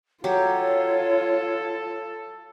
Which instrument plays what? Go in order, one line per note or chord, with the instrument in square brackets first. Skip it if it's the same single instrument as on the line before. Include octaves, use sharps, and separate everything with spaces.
[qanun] F#3 G4 [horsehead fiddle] F4 [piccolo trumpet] A4 [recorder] C#5